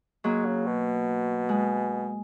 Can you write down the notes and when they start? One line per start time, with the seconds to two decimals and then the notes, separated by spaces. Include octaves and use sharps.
0.24 F#3 G#3 A#3
0.46 C#3
0.66 B2
1.49 G#3